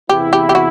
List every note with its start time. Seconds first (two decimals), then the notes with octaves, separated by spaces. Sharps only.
0.09 E2 C3 E3 B3 E4 G4
0.33 G4
0.49 G4
0.55 F#4